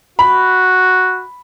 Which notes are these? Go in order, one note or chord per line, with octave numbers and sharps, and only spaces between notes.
F#4 B5